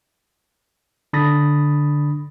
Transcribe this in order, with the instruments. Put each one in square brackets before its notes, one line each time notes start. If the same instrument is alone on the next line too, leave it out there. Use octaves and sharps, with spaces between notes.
[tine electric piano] D3 D4 B5 D#6 A6 A#6